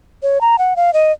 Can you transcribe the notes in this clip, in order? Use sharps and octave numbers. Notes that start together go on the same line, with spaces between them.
C#5
A#5
F#5
F5
D#5